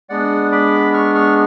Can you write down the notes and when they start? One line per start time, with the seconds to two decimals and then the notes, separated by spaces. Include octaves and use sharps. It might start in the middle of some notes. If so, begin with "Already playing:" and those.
0.09 G#3 B3 D4 D5 F#5
0.52 B5 D6
0.93 C#6 F6
1.14 C#6 F6